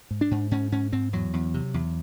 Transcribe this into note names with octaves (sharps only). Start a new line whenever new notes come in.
G#2
D4
G#2
G#2 C#4
G#2 C#4
G#2 C4
E2 F#3
E2
C3
E2